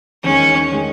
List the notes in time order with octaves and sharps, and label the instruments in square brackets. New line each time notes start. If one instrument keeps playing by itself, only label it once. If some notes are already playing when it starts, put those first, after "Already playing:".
[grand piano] E2 D#3 G#3 [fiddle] C#4
[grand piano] D#3 G#3